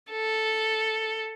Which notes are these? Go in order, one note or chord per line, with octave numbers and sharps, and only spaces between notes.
A4